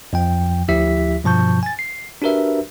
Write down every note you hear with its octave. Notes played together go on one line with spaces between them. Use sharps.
F2 F3 G5
D2 F3 E4 G4 E5 B6
G2 B2 F3 A5 C#6 G6
G#5 A6
C7
D4 F#4 G4 A#4 B4 E5